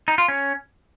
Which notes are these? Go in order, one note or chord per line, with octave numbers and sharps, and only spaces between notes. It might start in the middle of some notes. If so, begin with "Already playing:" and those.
D#4
F4
C#4